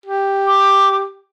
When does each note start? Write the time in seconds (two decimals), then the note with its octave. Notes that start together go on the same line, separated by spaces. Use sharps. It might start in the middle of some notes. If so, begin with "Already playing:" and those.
0.06 G4
0.47 D6